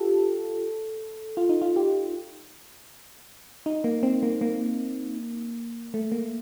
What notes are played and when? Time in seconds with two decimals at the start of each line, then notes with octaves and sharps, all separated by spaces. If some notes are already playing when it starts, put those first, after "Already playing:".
Already playing: F4 G4 A4
1.37 F4
1.49 D#4
1.62 F4
1.76 G4
3.66 D#4
3.84 A#3
4.03 C4
4.23 A#3
4.41 A#3
5.94 A3
6.12 A#3